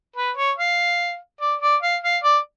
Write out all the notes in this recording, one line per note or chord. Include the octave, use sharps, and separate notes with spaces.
B4
C#5
F5
D5
D5
F5
F5
D5